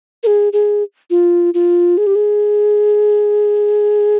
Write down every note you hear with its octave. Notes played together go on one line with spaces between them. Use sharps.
A#4
G#4
G#4
F4
F4
G#4
G4
G#4